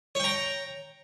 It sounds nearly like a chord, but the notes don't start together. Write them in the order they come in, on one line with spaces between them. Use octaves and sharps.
C#5 G5 A#5